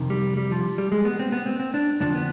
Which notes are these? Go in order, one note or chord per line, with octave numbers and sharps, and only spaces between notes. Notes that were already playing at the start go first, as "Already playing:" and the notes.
Already playing: F2 C3 D#3
G3
G3
F3
G3
G#3
B3
C4
B3
C4
C4
D4
F2 D3 F3 D4
B3